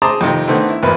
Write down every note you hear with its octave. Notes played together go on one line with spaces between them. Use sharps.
G#4 C5 A5 A#5 D6 D#6
F2 C3 D#3
D3 D#3 A3 B3 C4
E4
G#1 E2 A#3 B4 B5